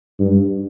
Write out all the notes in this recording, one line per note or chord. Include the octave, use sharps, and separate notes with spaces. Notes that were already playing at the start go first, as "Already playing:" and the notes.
G2